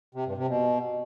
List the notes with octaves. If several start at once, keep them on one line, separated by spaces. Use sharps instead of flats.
C3
G2
C3
B2